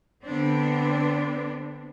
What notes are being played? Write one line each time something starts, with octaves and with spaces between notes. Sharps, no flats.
D3 B3 C4 D4